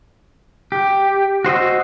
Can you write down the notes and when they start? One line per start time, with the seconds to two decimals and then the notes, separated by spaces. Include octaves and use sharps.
0.72 G4
1.45 F#4 C5 D#5 E6